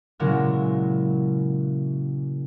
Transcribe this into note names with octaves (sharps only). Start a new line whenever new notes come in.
A#2 C#3 F#3 G#3 E4 A#4